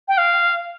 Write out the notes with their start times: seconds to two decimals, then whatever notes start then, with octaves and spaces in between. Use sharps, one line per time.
0.08 G5
0.18 F5